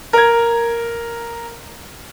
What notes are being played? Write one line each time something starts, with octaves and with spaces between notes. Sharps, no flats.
A#4 G#6